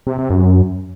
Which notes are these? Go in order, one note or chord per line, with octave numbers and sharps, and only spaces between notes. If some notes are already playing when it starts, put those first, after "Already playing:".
C3
C3
F#2